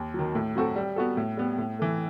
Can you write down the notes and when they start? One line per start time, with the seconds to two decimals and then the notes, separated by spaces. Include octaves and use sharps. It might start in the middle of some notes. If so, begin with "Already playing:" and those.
Already playing: D#2
0.14 D#3 F#3
0.35 A2
0.55 F#3 C4 F#4 A4
0.76 G3
0.96 B3 F#4 A4
1.17 A2
1.37 G3 B3
1.58 A2
1.79 E3 A3